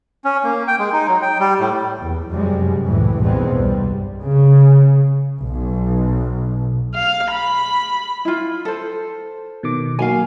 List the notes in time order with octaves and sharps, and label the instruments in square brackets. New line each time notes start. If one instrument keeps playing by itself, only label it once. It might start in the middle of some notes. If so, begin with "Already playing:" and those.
[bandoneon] C#4
A#3
G5
G#3
D#4
F#3
G5
G3
A2
[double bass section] E2
F#2 C3 G3 G#3
C#2 A2 E3
B1 E2 G2 G#3 B3 C4
C2 G3
C#3
B1
[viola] F5
B5
[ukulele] E4 F4
A4 C5
[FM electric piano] B2 D#3 D6
[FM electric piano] F#3 A#3 F#4 [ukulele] F5 G#5